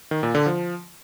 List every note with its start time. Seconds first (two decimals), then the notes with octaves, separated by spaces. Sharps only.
0.11 D#3
0.23 A#2
0.35 D3
0.46 F3